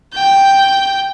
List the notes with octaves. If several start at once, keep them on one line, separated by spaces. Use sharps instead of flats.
G5